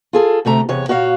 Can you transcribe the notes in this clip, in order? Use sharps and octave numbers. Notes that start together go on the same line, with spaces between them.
F4 G#4 A4
D2 C3 A3 A#5
E2 C3 C#5
A#2 F#4 C#5 D5 F5